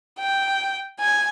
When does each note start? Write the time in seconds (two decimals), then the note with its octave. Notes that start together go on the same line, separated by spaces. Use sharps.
0.19 G5
1.00 G#5